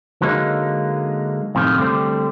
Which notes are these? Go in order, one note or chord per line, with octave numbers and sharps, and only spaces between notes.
D3 F#3 G#3 A#3 D#4
F2 A2 C3 D#3
D3 G3 A3 C4